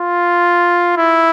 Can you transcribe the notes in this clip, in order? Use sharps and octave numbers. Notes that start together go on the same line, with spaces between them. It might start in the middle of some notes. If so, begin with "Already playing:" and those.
Already playing: F4
E4